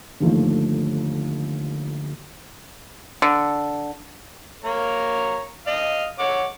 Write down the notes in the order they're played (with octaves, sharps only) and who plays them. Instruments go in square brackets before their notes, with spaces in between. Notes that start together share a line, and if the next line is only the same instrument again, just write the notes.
[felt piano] G1 D#2 F3 A3
[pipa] D3
[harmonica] A#3 C#5 A#5
D#5 F5
C#5 F#5 D6